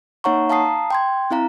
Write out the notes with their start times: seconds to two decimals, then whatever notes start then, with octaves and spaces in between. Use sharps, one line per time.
0.24 A#3 D#4 C#5 F#5 A#5 C#6
0.50 F5 A5 A#5 D#6 C7
0.90 G5 C6 G#6
1.31 C4 E4 F5 A#5